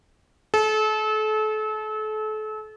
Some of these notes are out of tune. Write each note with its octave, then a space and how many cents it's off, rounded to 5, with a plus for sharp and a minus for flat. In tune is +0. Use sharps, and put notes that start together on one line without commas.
A4 -35